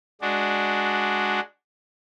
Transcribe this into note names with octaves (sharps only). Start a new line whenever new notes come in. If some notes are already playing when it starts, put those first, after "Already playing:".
G#3 D4 F#4